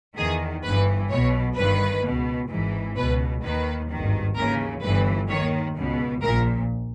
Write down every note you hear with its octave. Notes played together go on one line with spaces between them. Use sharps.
E2 D#3 G#4
G1 G2 E3 B4
B1 B2 C#5
G1 G2 D#3 B4
C#2 B2
G#1 G#2 E3
C#2 B2 B4
D#2 D#3 B4
G#1 G2 D#3
D#2 C#3 E3 A#4
G1 G2 E3 B4
D#2 D#3 C#5
C#2 B2
A#1 A#2 A#4